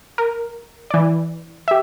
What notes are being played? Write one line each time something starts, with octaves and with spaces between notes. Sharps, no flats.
A#4
E3 D5
G4 E5